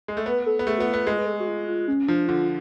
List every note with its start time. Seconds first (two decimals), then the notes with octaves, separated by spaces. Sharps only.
0.08 G#3
0.17 A3
0.25 B3 B4
0.46 A4
0.59 B3
0.67 A3 G#4
0.78 B3 F#4
0.86 F4
0.94 B3
1.07 G#3
1.18 B4
1.26 A4
1.34 G#4
1.40 F#4
1.48 F4
1.68 F4
1.88 C#4
2.07 F3 D4
2.28 D3 F4